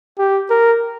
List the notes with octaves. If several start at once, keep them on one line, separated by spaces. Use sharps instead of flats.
G4
A#4